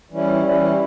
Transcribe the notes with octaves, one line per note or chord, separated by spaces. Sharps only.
E3 G3 C#4 E4
E3 G3 C#4 E4